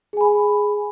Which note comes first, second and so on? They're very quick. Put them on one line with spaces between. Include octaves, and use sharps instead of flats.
G#4 G#5 B5